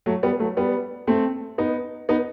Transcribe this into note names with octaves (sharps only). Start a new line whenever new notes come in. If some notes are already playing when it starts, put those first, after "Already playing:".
F#3 A3
G3 B3
F#3 A3
G3 B3
A3 C4
B3 D#4
B3 D#4